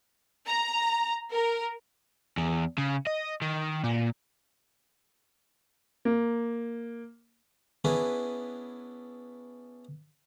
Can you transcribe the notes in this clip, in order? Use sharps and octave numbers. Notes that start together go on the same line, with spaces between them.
A#5
A#4
E2
C#3
D#5
D#3
A#2
A#3
B3 C#4 D4 E4 G#4 B4